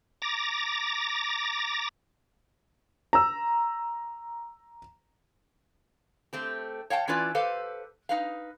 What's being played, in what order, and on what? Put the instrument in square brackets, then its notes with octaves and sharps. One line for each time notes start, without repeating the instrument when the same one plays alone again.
[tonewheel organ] A#5 D6 A6 A#6
[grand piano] A#5 E6
[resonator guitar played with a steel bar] A3 C4 G4
C#5 F5 G5 A5
E3 C#4 E4 F4 B4 D5
G4 A4 B4 C5 F5
D#4 B4 F5